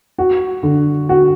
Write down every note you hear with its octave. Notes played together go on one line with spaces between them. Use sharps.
F#4
D3
F#4